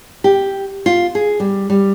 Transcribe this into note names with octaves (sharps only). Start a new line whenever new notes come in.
G4
F4
G#4
G3
G3